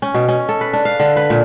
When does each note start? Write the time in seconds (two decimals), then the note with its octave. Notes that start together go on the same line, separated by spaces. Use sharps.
0.02 C#4
0.14 B2
0.28 C#4
0.49 A4
0.61 B4
0.73 D4
0.85 F5
1.00 D3
1.17 B4
1.30 A#2